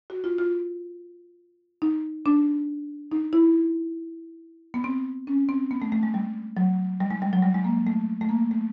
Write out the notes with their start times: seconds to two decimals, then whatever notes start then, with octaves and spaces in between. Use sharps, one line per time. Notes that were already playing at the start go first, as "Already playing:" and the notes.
0.10 F#4
0.24 F4
0.39 F4
1.82 D#4
2.26 D4
3.12 D#4
3.33 E4
4.74 B3
4.84 C4
5.27 C#4
5.49 C4
5.71 B3
5.82 A3
5.92 A3
6.03 G#3
6.14 G3
6.57 F#3
7.00 G3
7.11 G#3
7.22 G3
7.33 F#3
7.42 G3
7.54 G#3
7.64 A#3
7.87 A3
8.21 A3
8.29 A#3
8.51 A3